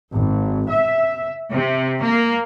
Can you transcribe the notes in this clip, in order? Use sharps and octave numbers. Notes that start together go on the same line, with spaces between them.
G#1
E5
C3
A#3